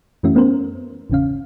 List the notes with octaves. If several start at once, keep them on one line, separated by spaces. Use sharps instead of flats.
F#2 E3 A3 C#4 F#4 E5
A3 B3 C#4 A#4 C5
G#1 E2 C#3 C#4 F5